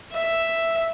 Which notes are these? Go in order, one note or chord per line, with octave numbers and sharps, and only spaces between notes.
E5